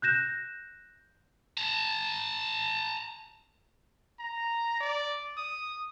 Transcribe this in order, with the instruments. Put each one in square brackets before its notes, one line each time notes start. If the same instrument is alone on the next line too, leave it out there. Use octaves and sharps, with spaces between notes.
[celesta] F#6 G6 A#6 E7
[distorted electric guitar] A5 A#5
[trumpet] A#5
D5
D#6